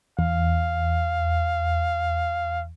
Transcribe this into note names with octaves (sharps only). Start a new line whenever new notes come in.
E2 F5